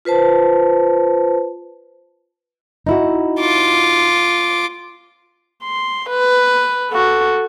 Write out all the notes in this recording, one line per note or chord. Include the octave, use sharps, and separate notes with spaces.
F4 B4 C5 A5
D#4 E4 F#4
F4 D6
C6
B4
F#4 A4